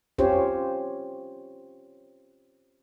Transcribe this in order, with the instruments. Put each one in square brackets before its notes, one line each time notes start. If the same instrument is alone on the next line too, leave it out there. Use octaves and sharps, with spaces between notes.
[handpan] C4 C#4 F4 G4 C5 C#5